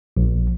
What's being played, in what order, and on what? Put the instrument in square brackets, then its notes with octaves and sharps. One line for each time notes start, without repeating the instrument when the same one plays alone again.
[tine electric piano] A#1